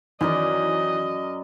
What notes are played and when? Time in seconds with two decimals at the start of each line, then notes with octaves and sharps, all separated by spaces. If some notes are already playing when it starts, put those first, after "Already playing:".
0.21 F#2 D#3 E3 A#4 D5 D#5